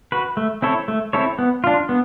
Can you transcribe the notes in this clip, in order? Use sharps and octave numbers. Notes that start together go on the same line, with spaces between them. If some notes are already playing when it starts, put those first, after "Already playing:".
F#4 B4
A3
C4 E4 A4 C#5
A3
C4 E4 A4 C#5
B3
D4 F4
B3